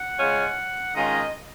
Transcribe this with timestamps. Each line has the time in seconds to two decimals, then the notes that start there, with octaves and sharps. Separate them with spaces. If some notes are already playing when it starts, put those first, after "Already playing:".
Already playing: F#5
0.19 C#3 G#3 C#4 F4
0.96 D#3 G#3 C#4 F4 D#5